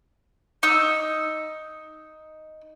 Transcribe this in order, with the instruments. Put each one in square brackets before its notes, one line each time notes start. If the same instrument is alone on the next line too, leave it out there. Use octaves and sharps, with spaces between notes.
[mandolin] D#4 E6